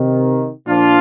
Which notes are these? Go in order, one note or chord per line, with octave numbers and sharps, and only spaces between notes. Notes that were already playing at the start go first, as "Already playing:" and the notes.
Already playing: C3 D#3
A#2 F3 D4 F4